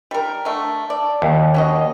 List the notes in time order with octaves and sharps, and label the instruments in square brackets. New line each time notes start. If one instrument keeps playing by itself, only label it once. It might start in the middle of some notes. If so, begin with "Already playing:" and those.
[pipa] G3 A#4
D3 A3
D5
[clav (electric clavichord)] D#2
[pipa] C#4 F#4 D#5